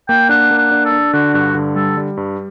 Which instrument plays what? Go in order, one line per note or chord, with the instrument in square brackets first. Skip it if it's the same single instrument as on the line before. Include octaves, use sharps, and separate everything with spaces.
[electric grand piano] A#3 [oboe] G5
[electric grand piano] D4 [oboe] F#5
[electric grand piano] A#3
[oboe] F#5
[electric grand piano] D4
[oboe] A4
[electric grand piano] D4
[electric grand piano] D3 [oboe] F#4
[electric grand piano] G2 [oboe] F#4
[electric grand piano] D3
[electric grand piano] G3 [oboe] A4
[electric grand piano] G3
G2